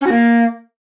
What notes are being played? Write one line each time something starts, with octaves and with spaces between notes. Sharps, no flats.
C#4
F#4
A#3